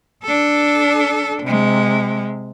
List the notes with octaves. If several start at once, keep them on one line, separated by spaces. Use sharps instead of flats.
D4 A4
C3 G#3